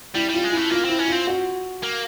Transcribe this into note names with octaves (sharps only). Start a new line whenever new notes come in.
G3 E4
G3 F4
G#3
A3 E4
A#3 F4
C4 E4
C#4
C4 F4
F#4
A#3